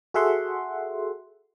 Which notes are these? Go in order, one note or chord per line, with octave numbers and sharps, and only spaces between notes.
F#4 G#4 A4 E5 F#5 C6